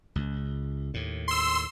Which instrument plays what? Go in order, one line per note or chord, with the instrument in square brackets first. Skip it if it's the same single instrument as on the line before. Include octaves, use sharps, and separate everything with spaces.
[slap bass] C#2
D#2 A2
[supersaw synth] C6 E6